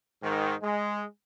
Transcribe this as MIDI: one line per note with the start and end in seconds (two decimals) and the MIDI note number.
0.23 0.55 44
0.23 0.55 51
0.62 1.04 56